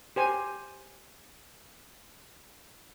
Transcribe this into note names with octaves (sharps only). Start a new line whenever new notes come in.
G4 C5 G#5